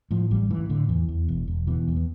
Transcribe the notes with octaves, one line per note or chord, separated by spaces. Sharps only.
A2 F3
A1 G3
A2 E3
A2 D3
E2 E3
E2
E1
E1
B2 E3
E2
B3